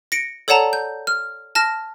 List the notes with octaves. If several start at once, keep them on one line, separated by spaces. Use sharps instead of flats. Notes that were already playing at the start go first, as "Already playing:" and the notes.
A#6 C#7 D7
A4 C#5 D5 F#5 A5 A#5
G6
F6
A5 F6 A#6